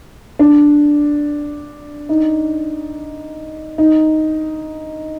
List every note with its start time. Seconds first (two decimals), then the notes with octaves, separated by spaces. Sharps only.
0.39 D4
2.09 D#4
3.78 D#4